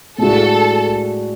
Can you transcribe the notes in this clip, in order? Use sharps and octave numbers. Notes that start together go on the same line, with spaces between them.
A2 G#3 D4 F#4 A4